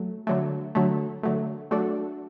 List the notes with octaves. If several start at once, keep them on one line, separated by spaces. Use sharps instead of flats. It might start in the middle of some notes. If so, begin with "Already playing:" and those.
Already playing: F#3 A3
D3 F#3 A3
D3 F#3 A3
D3 F#3 A3
F#3 A3 D4 F#4 A4